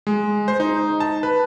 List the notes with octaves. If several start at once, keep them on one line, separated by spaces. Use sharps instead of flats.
G#3
C5
D#4
A5
B4